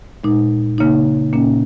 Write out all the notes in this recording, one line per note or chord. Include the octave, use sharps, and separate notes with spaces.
A#2 G#3 D#4
C#3 A#3 D#4
A#2 A#3 C#4